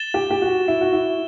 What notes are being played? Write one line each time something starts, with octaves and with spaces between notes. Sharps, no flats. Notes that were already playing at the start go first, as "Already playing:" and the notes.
Already playing: A6 E7 G7
G4
G4
F#4
E4
F#4
E4